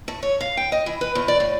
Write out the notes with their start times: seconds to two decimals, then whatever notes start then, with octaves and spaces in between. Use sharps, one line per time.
0.08 A3
0.23 C#5
0.40 F5
0.57 G5
0.72 D#5
0.86 E3
1.01 B4
1.15 E2
1.28 D5
1.40 A2